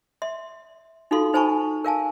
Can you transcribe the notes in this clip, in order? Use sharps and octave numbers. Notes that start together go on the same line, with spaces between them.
E5 C6
D#4 F4 F#4 A4 F5 C6
D#4 C5 G#5 A5 B5 C#6
A#4 F5 G#5 A5